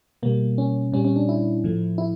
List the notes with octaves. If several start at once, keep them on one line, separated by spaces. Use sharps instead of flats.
B2 G3 A#3
C#4
A#2 G3 C#4
C#4
D4
E4
A2 F3 A3
E4